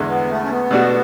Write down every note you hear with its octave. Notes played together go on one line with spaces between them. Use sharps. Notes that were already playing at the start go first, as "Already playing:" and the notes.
Already playing: E2 D3 G#3
B3
A3
C#4
B3
B2 A3 D4 F#4